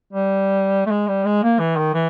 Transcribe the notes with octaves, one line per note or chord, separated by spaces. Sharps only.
G3
A3
G#3
G3
G#3
A#3
E3
D#3
E3